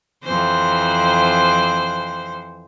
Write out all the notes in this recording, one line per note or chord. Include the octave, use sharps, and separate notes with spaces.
F2 E3 C5